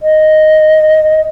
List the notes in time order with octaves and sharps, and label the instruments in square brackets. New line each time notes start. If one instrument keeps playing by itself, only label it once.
[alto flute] D#5